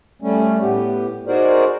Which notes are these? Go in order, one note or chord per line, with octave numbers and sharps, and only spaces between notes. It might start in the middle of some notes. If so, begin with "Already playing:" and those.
G3 A3 C#4
A2 B3 G4
D#4 F#4 G#4 A#4 C5 D5